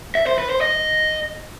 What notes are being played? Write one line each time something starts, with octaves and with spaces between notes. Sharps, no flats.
E5
C5
B4
C5
D#5